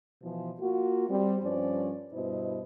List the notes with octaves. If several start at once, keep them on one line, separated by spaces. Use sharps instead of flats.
B2 E3 F3
A#3 F4 F#4
G3 C4
G2 F3 C#4 C5 D5
G2 B2 E4 C5 D#5